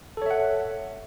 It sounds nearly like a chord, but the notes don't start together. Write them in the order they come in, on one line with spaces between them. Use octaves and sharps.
A4 C#5 E5 F#5